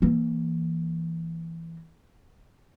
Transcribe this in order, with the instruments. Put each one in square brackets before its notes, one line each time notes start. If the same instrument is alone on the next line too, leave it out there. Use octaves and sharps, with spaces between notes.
[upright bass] E3 A#3